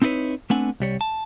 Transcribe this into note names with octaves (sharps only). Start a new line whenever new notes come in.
C4 D#4 E4 F#4 B4 C#5
A3 B3 C4 D4 F#5 G#5
C2 G3 C#5
A5